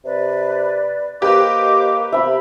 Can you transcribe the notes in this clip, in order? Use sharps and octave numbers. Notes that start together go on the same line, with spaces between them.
C3 B4 D5
A#3 G4 B4 C5 D#5 D6
C3 E5 B5